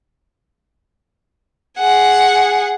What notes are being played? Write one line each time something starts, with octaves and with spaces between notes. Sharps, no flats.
G#4 F#5